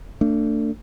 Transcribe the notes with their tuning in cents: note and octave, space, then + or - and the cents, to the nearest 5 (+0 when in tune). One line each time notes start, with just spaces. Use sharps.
A3 +40 D4 +0